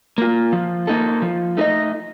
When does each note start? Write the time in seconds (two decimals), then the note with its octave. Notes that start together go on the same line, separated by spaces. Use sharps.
0.18 A#3 F4
0.53 F3
0.87 A#3 D#4 A4
1.22 F3
1.57 A3 D#4 A#4 D#5